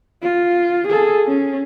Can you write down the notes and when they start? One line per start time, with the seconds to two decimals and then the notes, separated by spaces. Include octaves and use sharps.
0.22 F4
0.88 G#4 A4
1.27 C#4